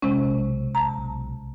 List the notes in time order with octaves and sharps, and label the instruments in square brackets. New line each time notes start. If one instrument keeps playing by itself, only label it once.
[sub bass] F1 [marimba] C3 G#3 C#4
[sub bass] B1
[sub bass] E1 [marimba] A5 A#5
[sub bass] B1